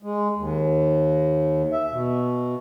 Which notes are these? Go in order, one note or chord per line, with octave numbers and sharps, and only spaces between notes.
G#3
D#2
E5
B2